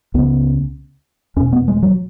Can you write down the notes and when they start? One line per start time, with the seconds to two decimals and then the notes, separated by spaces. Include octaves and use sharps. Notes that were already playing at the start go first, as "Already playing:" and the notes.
0.14 C#2 C#3 B3
1.36 E2 C#4
1.40 B2
1.53 B3
1.68 G#3
1.83 F#3